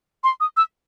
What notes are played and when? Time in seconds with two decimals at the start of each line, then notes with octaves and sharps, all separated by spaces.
0.24 C6
0.40 D#6
0.57 E6